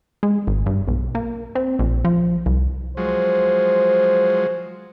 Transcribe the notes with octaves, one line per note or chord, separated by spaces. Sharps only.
G#3
G#1
G2
B1
A#3
C4
A#1
F3
C2
F3 F#3 G#3 C5